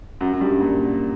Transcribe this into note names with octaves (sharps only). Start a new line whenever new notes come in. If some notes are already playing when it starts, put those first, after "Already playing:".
F#2
F#2
G2
A#2